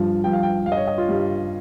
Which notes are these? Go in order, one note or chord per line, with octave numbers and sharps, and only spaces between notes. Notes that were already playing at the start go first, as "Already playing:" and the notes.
Already playing: G2 F3
G2 F3 G5
F5
G5
G2 G3 F5
D#5
C#5
D#5
F4
G2 G3